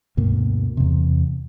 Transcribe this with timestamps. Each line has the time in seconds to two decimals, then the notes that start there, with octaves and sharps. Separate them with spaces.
0.17 D2 G2 B2 A#3
0.77 E2 C3